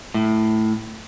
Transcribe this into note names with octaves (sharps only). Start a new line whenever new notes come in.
A2